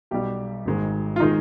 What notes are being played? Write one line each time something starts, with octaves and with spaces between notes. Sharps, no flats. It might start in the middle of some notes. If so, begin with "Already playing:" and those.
B1 B2 G3 G4
G#1 G#2 D#3 G#3
F4
D#3 G#3 D#4